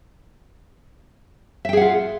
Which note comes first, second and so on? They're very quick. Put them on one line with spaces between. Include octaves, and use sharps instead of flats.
E5 G5 G#4 F#5 F4